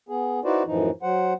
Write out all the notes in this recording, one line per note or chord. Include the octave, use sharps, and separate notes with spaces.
B3 G#4
D#4 E4 F#4 B4 C5 D5
F#2 A2 E3 F3 D#4
F#3 C5 F#5